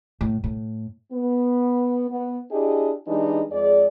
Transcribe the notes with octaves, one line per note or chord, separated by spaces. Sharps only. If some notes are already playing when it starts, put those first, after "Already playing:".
A2
A2
B3
B3
D4 E4 G4 G#4 D#5
E3 G3 G#3 D4 D#4
F2 G#3 G#4 D5